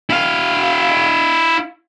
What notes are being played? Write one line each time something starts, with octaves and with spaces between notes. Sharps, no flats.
E4 F5